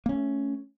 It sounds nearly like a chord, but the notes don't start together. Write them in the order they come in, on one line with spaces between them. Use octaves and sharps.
A#3 C#4 A3